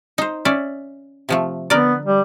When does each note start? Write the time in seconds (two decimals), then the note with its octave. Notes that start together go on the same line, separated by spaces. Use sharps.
0.18 D#4 C5
0.45 C#4 D5 E5
1.29 C3 F3 A3
1.70 D3 B3 A#4 D5
2.05 G3